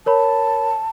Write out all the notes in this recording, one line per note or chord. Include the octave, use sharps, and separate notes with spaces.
A#4 C#5 A5 B5